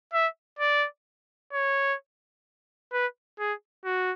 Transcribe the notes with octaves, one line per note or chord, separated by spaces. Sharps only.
E5
D5
C#5
B4
G#4
F#4